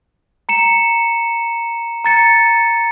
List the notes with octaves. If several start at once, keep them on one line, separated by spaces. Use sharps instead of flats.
A#5 C#7 E7
A#5 A6 C#7